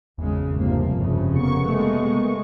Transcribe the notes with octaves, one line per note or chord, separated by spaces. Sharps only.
G#1 E2 C#3 G#3
G2 C3 F3 A#3
F1 C#3
C3 A#3 B3 C#6
G#3 A3